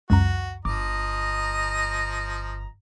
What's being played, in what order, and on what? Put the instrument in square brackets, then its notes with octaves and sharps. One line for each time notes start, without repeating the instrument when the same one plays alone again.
[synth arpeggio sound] C#2 F#2 A#5 [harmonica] F#4
[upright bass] G1 [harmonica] F3 D#5 A#5 [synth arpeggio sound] D6